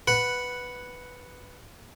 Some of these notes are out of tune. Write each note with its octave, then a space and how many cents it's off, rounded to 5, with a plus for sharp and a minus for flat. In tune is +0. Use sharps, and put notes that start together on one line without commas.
B4 +0 F#5 +0